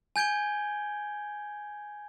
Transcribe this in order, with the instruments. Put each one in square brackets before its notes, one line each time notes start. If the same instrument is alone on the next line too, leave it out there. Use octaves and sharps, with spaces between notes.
[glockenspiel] G#5 G6 G#6 D7 G7